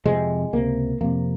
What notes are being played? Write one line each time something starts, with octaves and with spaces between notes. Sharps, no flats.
F2 C3 G#3
C#2 C3 A#3
F2 C3 A#3